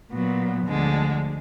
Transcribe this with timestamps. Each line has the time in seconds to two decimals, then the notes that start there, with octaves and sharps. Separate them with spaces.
0.11 A#2 F#3 B3
0.67 D2 D3 F3 G#3 D4